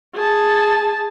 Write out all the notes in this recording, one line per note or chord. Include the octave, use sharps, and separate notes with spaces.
G#4 A5